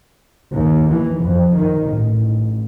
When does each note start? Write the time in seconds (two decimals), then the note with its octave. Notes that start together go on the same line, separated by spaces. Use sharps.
0.52 D#2
0.91 E3
1.22 F2
1.55 D#3
1.91 A1